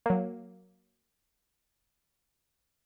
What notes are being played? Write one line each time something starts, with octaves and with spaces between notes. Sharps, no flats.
F#3 A#3